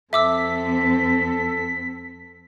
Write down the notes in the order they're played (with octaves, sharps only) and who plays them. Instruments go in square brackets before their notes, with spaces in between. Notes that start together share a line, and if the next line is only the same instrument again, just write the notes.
[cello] F2 C4 [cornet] A4 [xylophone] E5 D6 E6 [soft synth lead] B6